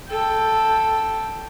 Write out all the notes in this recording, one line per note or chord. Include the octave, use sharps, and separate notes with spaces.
A4 G5